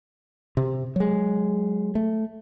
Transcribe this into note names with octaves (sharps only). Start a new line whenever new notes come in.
C3
F#3 G#3
A3